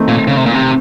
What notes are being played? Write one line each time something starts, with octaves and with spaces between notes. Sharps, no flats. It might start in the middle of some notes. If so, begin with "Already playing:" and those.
Already playing: D#3 A3 C4
A#2
C#3
C3
A#2
C3